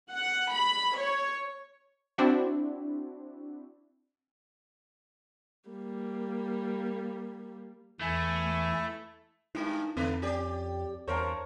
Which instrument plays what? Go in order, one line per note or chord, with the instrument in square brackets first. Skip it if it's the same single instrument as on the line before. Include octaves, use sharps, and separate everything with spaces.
[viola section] F#5
B5
C#5
[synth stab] C4 D4 E4 F#4
[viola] G3 A#3
[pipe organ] E2 E3 G#5 [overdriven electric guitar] A3 [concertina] E4
[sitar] G2 G#3 [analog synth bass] D#4 [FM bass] E4
[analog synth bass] F2 [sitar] D3 A3 B4 [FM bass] C4
[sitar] C#4 G4 [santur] D5
[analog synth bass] E2 [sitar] G2 A#4 C5 [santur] C#5 A5 A#5